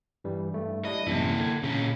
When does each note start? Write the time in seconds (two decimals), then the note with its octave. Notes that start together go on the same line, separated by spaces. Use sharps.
0.24 G2 E3 G3
0.54 G2 A3
0.85 G3 D4 E4 D#5
1.07 A1 F#2 C3 A#3 E4
1.38 D3 G#6
1.63 A#2 C#3 C#4